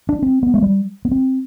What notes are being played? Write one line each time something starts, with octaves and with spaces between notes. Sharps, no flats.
D4
C4
B3
G#3
G3
B3
C4